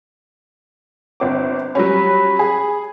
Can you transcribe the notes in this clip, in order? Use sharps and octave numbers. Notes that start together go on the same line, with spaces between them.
G1 C4 D6
F#3 G3 C#4 B5
G#4